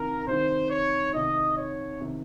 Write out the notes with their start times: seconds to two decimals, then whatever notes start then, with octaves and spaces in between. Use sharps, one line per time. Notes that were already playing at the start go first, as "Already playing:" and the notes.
Already playing: C2 C3 D#3 A#4
0.26 C2 C3 D#3 C5
0.70 C#5
1.13 C2 C3 D#3 D#5
1.56 C#5
2.01 C3 D#3